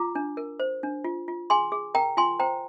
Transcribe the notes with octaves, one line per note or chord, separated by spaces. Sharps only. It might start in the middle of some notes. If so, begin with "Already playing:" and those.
Already playing: F4 A#5 D6
D4
A#4
C5
D4
F4
F4
G#4 G#5 C6
G#4
A#4 G5 A#5
F4 G#5 C6
C5 G5 A#5